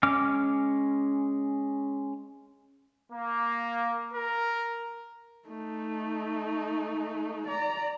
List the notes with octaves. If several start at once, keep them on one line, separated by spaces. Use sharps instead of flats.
G#3 C#4 D6 F6
A#3
A#4
A3 D#4
D5 A#5